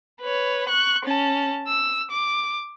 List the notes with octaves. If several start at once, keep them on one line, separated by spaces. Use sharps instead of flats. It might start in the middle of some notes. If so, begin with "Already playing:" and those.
B4 C#5
C#6 F#6
C#4 A5
E6
D6